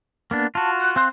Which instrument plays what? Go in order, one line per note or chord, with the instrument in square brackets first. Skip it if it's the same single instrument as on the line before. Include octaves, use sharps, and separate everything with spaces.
[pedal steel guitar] A#3 B3 D4
[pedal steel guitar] F4 F#4 [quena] A5
[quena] F#6
[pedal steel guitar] C4 F5 F#6 [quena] C6